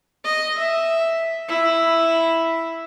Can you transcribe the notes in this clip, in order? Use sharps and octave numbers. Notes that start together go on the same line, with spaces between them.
D#5
E5
E4